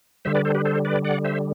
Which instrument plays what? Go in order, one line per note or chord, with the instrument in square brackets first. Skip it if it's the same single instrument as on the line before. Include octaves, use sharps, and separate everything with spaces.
[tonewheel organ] D3 G3 C5 E5
B4 D5
A4 C5
G4 B4
A4 C5
B4 D5
D5 F#5
C5 E5